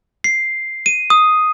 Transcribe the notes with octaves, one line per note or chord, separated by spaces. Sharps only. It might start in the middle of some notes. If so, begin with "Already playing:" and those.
C7
D#7
D#6